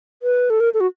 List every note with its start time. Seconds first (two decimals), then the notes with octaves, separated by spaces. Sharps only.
0.22 B4
0.50 A4
0.60 A#4
0.74 A4
0.80 F#4